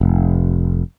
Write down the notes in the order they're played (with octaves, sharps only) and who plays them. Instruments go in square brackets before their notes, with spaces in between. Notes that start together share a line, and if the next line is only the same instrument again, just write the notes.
[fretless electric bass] F1